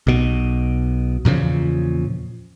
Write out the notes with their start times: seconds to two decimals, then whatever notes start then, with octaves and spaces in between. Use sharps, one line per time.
0.07 B1 B2
1.25 E2 A#2 C#3 F3